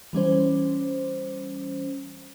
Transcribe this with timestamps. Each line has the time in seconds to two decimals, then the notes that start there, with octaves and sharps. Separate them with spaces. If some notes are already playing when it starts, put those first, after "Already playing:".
0.13 E3 G3 C#4 C5